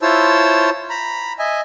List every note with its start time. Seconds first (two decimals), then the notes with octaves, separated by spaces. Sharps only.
0.02 E4 F4 C5 C#5 A5 E6
0.90 A#5 B5
1.39 D#5 E5 G#5